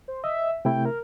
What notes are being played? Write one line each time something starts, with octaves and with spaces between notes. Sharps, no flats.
C5
D#5 E5
C3 A3 E4 G5
A#4